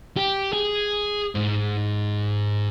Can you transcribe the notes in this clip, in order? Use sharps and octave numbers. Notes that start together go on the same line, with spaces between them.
G4
G#4
G#2